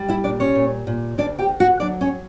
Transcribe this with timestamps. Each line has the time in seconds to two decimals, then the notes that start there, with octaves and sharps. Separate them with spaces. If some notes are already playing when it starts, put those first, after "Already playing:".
Already playing: G3
0.08 E4 E5
0.24 A#2 D4 D5
0.40 C#4 C#5
0.55 A#2
0.87 A#2
1.18 D2 D4 D5
1.38 G4 G5
1.49 D2
1.60 F#4 F#5
1.80 F#3 D4 D5
2.01 C#4 C#5